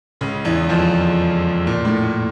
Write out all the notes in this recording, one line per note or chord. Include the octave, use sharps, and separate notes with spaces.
C#2 C#3
E2 E3
F2 F3
A#2
A2
A#2